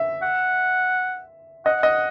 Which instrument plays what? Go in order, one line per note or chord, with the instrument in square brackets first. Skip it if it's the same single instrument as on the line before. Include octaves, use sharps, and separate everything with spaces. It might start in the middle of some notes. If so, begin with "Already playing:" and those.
Already playing: [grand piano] E5
[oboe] F#5
[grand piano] D#5 [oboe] F#5
[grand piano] D#5